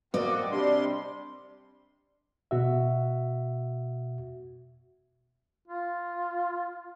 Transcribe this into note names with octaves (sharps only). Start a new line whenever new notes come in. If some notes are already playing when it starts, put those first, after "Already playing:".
A#3 C4 F#4 D5 D#5
C3 G3 D4 C6
B2 F#4 E5
F4